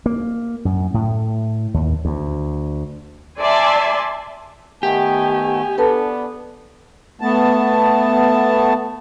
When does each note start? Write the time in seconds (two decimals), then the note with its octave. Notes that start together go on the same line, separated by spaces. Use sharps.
0.06 A#3
0.65 F#2
0.94 A2
1.74 D#2
2.05 D2
3.40 D5 E5 G#5 A5 C6
4.83 D#3 A3 B3 G4 G#5
5.78 B3 D4 A4 B4 A5
7.21 A3 B3 A5